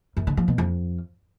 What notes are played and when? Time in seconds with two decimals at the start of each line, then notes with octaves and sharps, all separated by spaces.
0.17 F#2
0.27 D3
0.37 F3
0.48 B2
0.58 F2